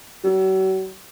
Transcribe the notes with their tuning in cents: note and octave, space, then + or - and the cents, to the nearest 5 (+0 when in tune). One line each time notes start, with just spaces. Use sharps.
F#3 +40